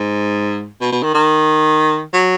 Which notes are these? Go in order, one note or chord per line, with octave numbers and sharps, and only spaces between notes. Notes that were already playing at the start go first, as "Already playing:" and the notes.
Already playing: G#2
B2
B2
D#3
D#3
F#3